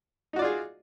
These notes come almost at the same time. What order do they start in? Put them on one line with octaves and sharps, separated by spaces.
D#4 F#4 D5 F4 G#4